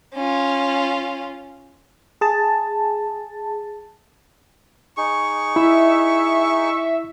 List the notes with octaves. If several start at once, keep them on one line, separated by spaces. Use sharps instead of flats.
C#4 F4
G#4 A5
D#4 G#4 C#6
E4 E5